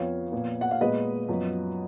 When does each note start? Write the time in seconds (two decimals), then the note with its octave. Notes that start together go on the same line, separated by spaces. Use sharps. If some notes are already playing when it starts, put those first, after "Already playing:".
Already playing: F2 F3 B3 C#5 F5
0.32 A#2 F3 B3
0.61 F#5
0.71 F5
0.81 A#2 G#3 B3 B4 D#5
1.29 F#2 F3 B3